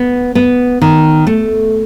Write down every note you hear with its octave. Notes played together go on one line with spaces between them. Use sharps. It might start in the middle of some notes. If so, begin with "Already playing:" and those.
Already playing: B3
B3
D#3
A3